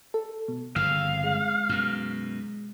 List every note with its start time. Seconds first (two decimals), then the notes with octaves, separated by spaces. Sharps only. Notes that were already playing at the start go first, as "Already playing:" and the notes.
0.14 A4
0.48 B2
0.76 G1 F2 C#3 F5 E6
1.24 G#3
1.69 F#2 B2